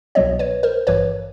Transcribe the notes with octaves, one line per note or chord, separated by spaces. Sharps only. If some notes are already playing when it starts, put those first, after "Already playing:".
C2 B2 F#3 B3 C#5 D#5
B4 C#5
A#4 C5
G#1 G2 E3 B4 C#5